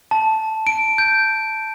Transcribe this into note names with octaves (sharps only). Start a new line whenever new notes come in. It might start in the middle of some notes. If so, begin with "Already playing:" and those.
A5
D7
G6